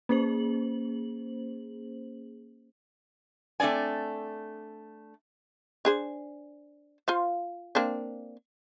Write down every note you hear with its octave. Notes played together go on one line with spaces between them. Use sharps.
A#3 C#4 G#4 C5 F#7
A3 C4 D4 D5 G#5
D4 G#4 C5
F4 C5 F5
A#3 C4 D4